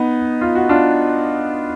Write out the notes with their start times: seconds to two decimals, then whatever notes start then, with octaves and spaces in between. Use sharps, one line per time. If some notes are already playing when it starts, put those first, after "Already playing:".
Already playing: B3 D#4
0.41 F4
0.55 F#4
0.69 D4 F4